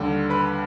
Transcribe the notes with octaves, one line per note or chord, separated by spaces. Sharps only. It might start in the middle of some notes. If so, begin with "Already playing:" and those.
Already playing: D#2 D3 G3
B4 B5